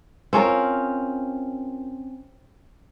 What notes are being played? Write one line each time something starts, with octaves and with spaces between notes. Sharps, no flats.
C4 C#4 F4 A#4